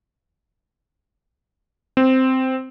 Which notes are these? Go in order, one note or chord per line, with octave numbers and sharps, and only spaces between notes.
C4